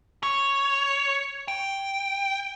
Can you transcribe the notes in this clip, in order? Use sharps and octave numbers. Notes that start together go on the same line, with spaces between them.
C#5
G5